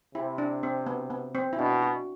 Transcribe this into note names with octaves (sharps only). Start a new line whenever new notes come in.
C3 E4
D4
C4
B3
B3
C4
E4
B2 D4
F#4